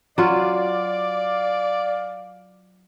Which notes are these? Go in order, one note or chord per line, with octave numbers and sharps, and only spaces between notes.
F#3 F4 D5 F5